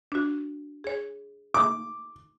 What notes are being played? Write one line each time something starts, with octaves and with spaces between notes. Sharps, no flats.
D4 F#4
G#4 C#5
D6